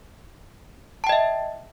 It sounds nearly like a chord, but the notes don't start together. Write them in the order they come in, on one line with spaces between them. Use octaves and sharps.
A5 G5 D#5 E5